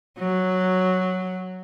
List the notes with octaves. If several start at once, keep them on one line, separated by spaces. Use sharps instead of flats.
F#3